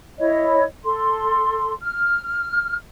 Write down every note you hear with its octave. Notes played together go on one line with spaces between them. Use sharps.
E4 C#5 D#5
A4 C6
F6